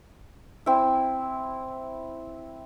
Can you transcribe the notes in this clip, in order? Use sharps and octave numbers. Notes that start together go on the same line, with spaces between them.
C4 E4